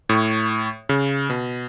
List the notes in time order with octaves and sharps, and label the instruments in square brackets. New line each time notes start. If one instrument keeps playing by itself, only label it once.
[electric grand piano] A2 C#6
C#3
B2